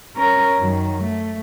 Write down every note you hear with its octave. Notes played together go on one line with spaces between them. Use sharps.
C#4 A#4
F#2 D#3
A3